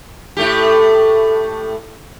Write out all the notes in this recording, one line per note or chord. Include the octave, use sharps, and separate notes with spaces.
A2 A3 G4